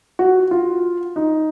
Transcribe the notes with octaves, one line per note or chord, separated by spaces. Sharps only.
F#4
F4
D#4